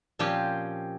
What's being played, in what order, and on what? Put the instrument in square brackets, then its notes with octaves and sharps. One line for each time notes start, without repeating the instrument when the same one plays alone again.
[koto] A#2 F3 C4 C#4 G4